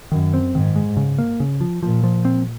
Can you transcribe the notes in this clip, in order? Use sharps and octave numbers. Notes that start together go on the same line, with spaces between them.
F#2 D#3
C4
G#2 D#3
G#3
C#3
A#3
C#3
F3
A#2 F3
F3
C4